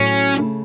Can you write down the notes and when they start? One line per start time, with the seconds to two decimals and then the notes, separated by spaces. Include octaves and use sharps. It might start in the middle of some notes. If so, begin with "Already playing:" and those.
Already playing: A2 F#3 A3 C#4
0.38 C#3 A3 E4